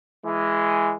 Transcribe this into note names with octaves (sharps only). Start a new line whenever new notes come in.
E3 G#3